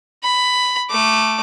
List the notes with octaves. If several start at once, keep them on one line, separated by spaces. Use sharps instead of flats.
B5
A3 D6